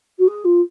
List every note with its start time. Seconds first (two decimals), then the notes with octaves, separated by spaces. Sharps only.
0.19 F#4
0.27 G#4
0.44 F4